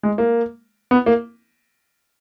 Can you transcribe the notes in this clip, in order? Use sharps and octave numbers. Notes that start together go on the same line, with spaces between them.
G#3
A#3
B3
A#3